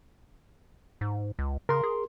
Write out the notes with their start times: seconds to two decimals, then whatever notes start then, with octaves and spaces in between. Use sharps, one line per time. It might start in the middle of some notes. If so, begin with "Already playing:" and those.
1.01 G#2
1.39 C#2
1.69 C#3 A#4 C6
1.83 G#4